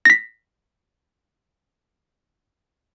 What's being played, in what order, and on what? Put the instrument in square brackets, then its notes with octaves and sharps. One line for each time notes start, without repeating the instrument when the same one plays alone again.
[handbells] A#6 B6